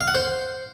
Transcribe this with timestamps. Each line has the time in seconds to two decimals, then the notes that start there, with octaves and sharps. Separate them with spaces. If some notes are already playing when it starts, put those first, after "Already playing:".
0.01 F5
0.08 F#5
0.15 C5